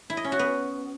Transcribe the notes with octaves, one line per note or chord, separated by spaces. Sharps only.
E4
D#5
C#4
F#4
B3